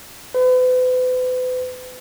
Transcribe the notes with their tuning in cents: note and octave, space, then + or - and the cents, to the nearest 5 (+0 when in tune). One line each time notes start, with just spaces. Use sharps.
B4 +40